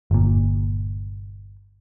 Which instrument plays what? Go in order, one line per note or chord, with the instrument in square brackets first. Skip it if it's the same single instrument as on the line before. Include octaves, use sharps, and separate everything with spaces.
[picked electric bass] G1 A#2